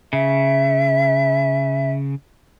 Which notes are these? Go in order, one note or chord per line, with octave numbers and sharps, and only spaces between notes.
C#3 E5